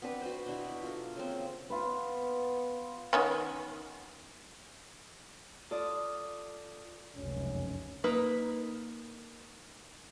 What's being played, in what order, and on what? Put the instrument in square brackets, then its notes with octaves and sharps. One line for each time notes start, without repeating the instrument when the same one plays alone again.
[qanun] B3 C4 D4 B4
F#4 B4 C5
B2 D4 E4
F4 A4 A#4
C#3 A#3 C4
[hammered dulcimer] F4 B4
[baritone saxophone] B3
[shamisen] D#3 B3 C#4
[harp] F4 A4 D5 D#6
[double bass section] F1 C#2 F#2 [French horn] C#4
[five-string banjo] A#3 D#4 B4